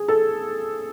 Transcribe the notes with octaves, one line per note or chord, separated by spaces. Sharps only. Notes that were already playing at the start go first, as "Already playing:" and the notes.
Already playing: G#4
A4